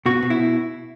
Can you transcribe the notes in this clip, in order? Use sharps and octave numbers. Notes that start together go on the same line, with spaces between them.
B2 F#4
B2
E4
B2